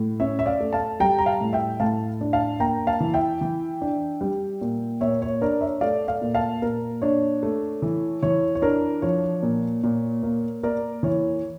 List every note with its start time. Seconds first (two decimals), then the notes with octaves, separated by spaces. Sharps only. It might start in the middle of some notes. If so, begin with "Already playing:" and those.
Already playing: A2
0.20 C#4 C#5 E5
0.39 E5
0.46 D5 F5
0.60 A3
0.73 F5 A5
1.00 G3 G5 A#5
1.18 A#5
1.26 F5 A5
1.41 A2
1.53 E5 G5
1.80 A2 F5 A5
2.21 D4
2.33 F5 A5
2.60 A#3 G5 A#5
2.87 F5 A5
3.00 E3
3.14 E5 G5
3.41 E3
3.81 D4
4.21 G3
4.61 A#2
5.01 A#2 C#5 E5
5.22 C#5
5.41 D4 A#4 D5
5.61 C#5 E5
5.81 A3 D5 F5
6.08 D5 F5
6.21 A#2
6.35 F5 A5
6.62 A#2 A#4
7.02 D4 C#5
7.43 A3
7.82 E3
8.23 E3 C#5
8.55 C#5
8.62 D4 A#4
9.02 F3 C#5
9.42 A#2
9.83 A#2
10.23 A#3
10.63 A#3 A#4 D5
11.03 E3 C#5